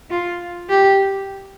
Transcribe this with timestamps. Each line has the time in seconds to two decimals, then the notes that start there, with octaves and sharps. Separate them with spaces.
0.11 F4
0.70 G4